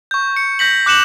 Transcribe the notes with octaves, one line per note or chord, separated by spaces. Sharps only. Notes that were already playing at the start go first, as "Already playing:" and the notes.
C#6 G6
C#7
G6 A#6 B6 F#7
D6 F#6 C#7 E7 F#7